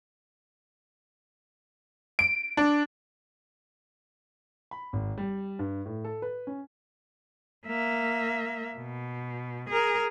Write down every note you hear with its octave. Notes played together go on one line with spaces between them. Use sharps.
D7
D4
B5
G#1
G3
G2
A2
A4
B4
C#4
A#3 E5
B2
G#4 A#4